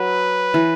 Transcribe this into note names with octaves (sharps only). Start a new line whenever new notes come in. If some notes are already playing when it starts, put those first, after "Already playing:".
Already playing: F#3 B4
E3